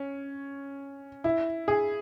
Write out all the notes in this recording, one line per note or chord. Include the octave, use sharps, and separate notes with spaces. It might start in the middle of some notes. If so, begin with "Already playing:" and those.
Already playing: C#4
E4
G#4